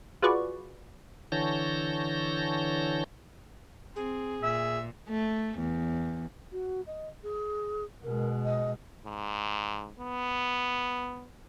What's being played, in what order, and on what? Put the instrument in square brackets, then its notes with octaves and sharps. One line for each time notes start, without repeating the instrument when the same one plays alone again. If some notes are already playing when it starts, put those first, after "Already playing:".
[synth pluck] F4 F#4 G#4 B4 D5 C#6
[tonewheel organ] D3 E3 C#5 A5 G6 A#6
[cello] C4 [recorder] G#4
[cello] A#2 [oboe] E5
[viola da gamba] A3
E2
[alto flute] F#4
D#5
G#4
[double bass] B2 G#3 [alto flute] A#4
[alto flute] D#5
[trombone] G#2
B3